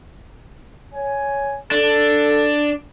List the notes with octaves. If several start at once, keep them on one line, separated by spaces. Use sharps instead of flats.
C#5 G#5
D4 A4